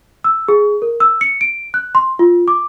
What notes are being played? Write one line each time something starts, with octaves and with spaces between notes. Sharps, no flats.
E6
G#4
A#4
E6
C#7
D7
F#6
C6
F4
D6